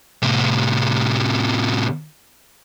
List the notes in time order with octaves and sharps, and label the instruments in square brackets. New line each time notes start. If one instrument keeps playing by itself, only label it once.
[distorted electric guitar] A2 C3